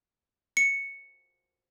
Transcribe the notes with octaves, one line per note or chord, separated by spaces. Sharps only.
C#7